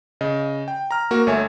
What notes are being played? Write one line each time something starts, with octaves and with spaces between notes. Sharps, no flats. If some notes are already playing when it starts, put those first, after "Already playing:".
C#3 D#5
G5
A#5 F6
A#3 F#4 A#4
G1 A3 C#5 E5 G#5